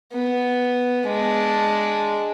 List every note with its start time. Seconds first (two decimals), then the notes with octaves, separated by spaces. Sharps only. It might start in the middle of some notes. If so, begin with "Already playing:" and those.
0.13 B3
1.07 G#3 D4